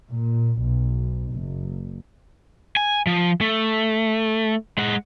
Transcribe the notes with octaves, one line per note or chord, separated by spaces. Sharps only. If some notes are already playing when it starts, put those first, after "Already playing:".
A#2
B1
F#1
G#5
F3
A3
G#3 F#5